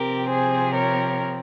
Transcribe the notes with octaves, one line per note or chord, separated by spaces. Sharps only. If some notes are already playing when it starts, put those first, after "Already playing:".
Already playing: C3 F3 C4 G4 A#4
G#4 C5
A#4 C#5